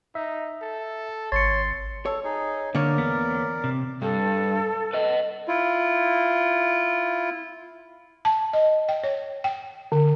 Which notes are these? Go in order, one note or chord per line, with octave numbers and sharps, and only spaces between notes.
D#4 E5
A4
G#1 C#5 C6 A6 C#7
A4 C#5
D#4 G#4
D3 A#3 A#4 C#5 D5
E2 B3
C3
G2 A4
B4 D#5
E4 F4
A5
D#5
G5
C#5
G5
D3